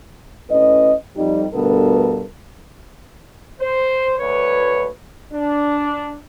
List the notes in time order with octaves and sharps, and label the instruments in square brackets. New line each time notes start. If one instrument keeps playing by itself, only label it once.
[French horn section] A2 C#4 B4 D#5
F2 G3 D#4
D2 G2 B2 B3 A4 A#4
[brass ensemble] C5
D2 B4 C#5
D4